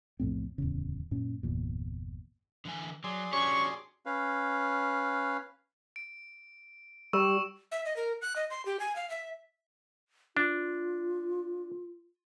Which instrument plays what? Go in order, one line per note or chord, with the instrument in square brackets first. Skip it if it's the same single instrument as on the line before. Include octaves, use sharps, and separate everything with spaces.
[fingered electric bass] B1 F2 A2 C4
D1 E2 C#3
F#2 A#2 C#4
G1 E2 A#2
[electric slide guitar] D3 E3 G#5
[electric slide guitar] F#3 [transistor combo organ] G#4 D5 C6
[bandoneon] C#4 C#5 [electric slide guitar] D4 F#4 G4 [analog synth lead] C#6
[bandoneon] C#4 B4 F5
[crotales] D7
[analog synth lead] G3 [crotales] C#6 E6 E7
[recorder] E5
D#5
A#4
F#6
D#5
C6
G4
G#5
F5
E5
[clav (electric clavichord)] D4 [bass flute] F4